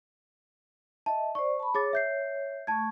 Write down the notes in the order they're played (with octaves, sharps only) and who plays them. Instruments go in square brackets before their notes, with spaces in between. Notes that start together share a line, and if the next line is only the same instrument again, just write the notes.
[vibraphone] D#5 E5 [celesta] A5
[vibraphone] C5 D5 [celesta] C#6
[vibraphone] A5 B5
[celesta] G#4 D6 A6 [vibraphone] C#5
[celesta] E5 G6 C7
[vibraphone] A3 C#6 [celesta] A5 G#6